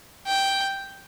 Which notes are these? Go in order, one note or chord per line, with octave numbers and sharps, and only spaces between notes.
G5